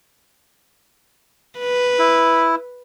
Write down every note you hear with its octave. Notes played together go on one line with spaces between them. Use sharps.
B4
E4